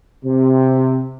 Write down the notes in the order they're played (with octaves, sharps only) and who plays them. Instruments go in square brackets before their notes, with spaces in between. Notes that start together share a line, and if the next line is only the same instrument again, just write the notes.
[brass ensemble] C3